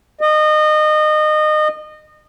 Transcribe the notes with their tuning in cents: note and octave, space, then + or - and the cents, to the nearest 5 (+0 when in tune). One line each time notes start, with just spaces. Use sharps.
D#5 -25